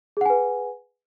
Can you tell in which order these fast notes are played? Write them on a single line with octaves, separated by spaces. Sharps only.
G#4 F#5 G#5 B4